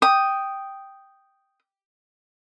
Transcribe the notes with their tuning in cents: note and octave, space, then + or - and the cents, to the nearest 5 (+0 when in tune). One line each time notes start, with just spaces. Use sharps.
G5 +0 D#6 +0